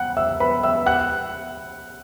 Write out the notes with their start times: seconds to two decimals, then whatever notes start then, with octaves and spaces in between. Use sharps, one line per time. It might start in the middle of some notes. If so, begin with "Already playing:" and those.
Already playing: F#5 F#6
0.17 E5 E6
0.40 B4 B5
0.63 E5 E6
0.86 F#5 F#6